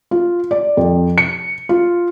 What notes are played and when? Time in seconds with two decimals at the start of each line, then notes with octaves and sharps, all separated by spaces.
0.11 F4
0.51 D5
0.77 F2
1.18 C#7
1.69 F4